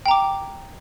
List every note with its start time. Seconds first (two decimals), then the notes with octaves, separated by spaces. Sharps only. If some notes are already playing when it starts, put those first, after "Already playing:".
0.06 G5
0.08 A#5
0.11 D6